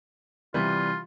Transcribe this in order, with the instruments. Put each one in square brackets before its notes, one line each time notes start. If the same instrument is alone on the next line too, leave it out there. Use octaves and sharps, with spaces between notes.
[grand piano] C3 E3 G3 [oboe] F4